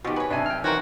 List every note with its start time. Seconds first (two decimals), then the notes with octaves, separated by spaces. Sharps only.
0.05 B2 D#3 F3 A3 F#4 G4
0.16 G#4 B4 C#5
0.30 B1 C3 D4 E5 G#5
0.46 G5 F6
0.64 D#3 E3 F#4 A#4 C5 C#5